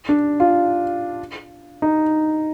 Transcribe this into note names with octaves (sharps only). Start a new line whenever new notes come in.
D4
F4
D#4